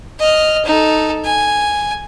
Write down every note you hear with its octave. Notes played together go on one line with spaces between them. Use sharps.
D#5 F6
D#4 A4
G#5